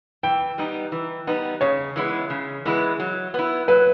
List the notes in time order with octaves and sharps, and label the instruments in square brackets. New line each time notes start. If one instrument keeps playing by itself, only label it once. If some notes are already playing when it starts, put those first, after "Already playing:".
[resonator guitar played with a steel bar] E3 [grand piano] G5
[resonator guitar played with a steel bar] G3 B3 D#4
E3
G3 B3 D#4
[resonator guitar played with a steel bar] C#3 [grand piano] C#5
[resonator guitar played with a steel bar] E3 G#3 B3 E4
C#3
E3 G#3 B3 E4
F#3
B3 E4
[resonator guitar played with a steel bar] F#3 [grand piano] B4